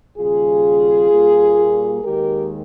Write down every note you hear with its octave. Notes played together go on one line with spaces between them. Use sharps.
D#2 C#3 G3 F4 G#4
A#2 G3 A#3
D#2 D#3 G#3 G4 A#4